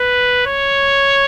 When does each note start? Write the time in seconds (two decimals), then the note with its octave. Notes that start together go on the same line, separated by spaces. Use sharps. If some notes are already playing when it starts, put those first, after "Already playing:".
Already playing: B4
0.46 C#5